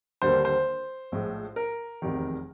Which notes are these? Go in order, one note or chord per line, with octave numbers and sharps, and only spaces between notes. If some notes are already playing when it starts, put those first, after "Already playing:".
D#2 D3 G3 A#3 C5
C5
A#1 A2 F3 G#3
A#4
F1 E2 C3 D#3